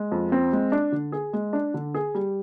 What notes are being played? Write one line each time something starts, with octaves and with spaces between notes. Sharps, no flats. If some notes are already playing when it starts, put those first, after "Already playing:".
Already playing: G#3
F2
C4
G#3
D4
D3
G#4
G#3
D4
D3
G#4
G3